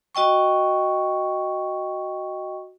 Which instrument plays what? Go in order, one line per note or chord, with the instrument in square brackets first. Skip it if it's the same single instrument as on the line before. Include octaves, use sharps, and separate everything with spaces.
[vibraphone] F#4 D#5 G5 C#6